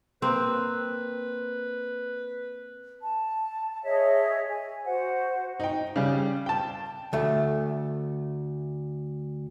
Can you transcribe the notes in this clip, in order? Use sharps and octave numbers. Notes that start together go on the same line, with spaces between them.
A#3 C4 B4
A5
G#4 C#5 D#5 E5
G#5
F#4 C5 F#5
D#4 G5
C#3 G3
G5 A5
D2 A3